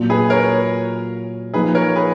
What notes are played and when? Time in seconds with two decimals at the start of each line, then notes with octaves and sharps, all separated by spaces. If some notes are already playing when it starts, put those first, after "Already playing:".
Already playing: A#2 F#3 A#3 F4
0.10 G#4 B4
0.30 A#4 C#5
1.54 F3 A#3 D#4 G#4 B4
1.75 A#4 C#5
1.96 G#4 B4